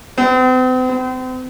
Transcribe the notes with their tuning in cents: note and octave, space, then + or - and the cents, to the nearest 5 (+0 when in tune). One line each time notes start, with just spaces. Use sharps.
C4 -45
C4 -40